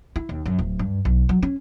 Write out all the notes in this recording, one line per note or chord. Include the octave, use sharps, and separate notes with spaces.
E4
D#2
F#2
D1
G2
B1
F#3
C#4